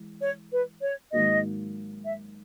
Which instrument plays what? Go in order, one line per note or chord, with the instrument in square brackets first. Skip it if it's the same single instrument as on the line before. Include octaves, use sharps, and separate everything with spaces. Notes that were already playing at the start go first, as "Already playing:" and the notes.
Already playing: [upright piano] E3 G#3
[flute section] C#5
B4
C#5
[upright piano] G#2 D#3 F#3 A#3 [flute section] D#5
[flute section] E5